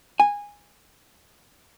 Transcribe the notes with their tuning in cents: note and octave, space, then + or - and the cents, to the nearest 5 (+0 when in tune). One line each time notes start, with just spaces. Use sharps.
G#5 -15